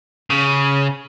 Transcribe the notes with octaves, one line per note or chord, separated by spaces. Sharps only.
C#3